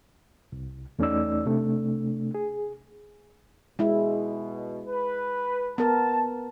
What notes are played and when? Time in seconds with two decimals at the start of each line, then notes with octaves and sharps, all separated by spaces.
0.52 C2
0.99 E2 A3 C#4 D#4 D5 E6
1.46 C3 A3 D4
2.35 G#4
3.79 B2 G#3 E4
4.86 B4
5.78 B3 A#4 A5